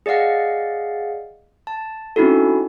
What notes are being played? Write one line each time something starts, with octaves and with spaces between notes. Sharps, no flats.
G#4 D5 D#5 F5 F#5
A5
C4 C#4 D#4 E4 F#4 A4